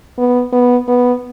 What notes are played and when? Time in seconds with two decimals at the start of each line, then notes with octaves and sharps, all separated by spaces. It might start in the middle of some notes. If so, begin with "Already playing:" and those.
0.18 B3
0.53 B3
0.88 B3